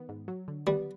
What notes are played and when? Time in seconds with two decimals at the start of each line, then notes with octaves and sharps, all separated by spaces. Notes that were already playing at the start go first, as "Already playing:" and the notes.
Already playing: D#3 B3
0.09 G#2
0.28 F#3
0.48 D3
0.67 G3 B3